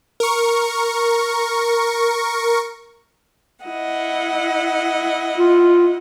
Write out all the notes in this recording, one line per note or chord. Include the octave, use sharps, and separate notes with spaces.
A#4 C#6
E4 D#5 F#5
F4